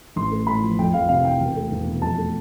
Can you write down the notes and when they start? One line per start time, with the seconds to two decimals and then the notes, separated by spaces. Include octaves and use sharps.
0.16 A1 C6
0.31 A3
0.47 A2 B5
0.63 F3
0.79 F2 G5
0.94 F2 F5
1.09 C3 F5
1.25 E3 G5
1.40 E1
1.56 A3
1.72 E2
1.87 B2
2.02 F2 A5
2.18 A3